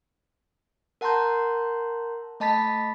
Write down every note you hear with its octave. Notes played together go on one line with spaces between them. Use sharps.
A#4 F#5 A5 A#5 C6 G6
A3 D#5 A5 B5 A6 B6